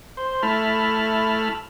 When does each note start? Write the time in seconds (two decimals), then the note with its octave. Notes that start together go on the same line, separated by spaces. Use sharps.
0.17 C5
0.43 A3 E4 A5 B5 F6